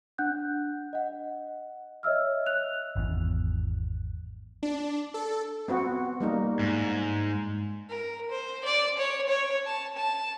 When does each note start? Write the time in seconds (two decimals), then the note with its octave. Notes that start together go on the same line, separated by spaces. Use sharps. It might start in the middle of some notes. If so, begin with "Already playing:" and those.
0.18 D4 F#5 F#6 G6
0.93 D#5 F#5
2.03 C#5 D#5 E5 E6 F6
2.46 F#6 F7
2.96 G#1 E2
4.63 D4
5.14 A4
5.68 B3 C4 F#4
6.20 G3 A#3 D#4
6.59 G#2
7.89 A#4
8.31 C5
8.64 D5
8.98 C#5
9.29 C#5
9.66 A5
9.97 A5